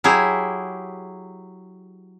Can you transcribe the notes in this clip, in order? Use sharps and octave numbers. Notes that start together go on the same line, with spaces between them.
F#3 E4 G4 G#4